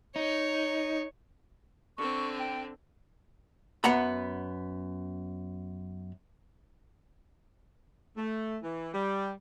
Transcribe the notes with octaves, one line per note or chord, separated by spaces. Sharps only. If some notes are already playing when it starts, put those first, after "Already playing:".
D#4 C#5
D3 C4 C#6
G5
F#2 B3 F#5 A#5 B5
A3
E3
G3